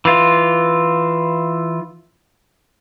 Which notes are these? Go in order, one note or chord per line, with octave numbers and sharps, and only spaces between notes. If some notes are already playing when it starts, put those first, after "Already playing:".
E3 F4